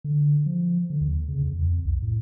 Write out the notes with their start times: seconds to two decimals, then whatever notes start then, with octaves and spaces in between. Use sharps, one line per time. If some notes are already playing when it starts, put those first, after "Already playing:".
0.04 D3
0.46 F3
0.90 D3
1.01 D#2
1.28 C#3
1.42 E2
1.62 F2
1.85 C2
2.02 A2